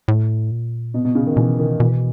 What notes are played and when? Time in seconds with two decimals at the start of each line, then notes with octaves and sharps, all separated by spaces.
0.08 A2
0.51 A#2
0.94 B2
1.05 B2
1.15 C#3
1.27 D#3
1.37 B2 E3
1.59 D#3
1.80 B2 E3